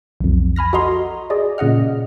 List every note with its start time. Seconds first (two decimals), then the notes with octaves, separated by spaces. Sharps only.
0.20 B1 F2
0.56 G#5 B5 F6 A#6
0.73 F#4 A4 D#5 A#5 C6
1.30 G#4 D5 D#5
1.58 A#2 C#3 D#5 F#5 F6